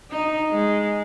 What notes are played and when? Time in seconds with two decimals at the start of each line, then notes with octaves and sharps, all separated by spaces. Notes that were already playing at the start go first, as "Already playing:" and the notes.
0.11 D#4
0.52 G#3